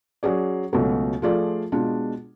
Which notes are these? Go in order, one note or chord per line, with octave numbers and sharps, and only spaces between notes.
F#3 C#4 G#4 D5
C#2 B2 F#3 A3
F3 A3 F4 G#4 D5
B2 G#3 D4 F4